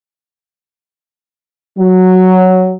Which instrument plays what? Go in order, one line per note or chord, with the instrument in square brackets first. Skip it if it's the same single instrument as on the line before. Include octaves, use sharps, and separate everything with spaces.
[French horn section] F#3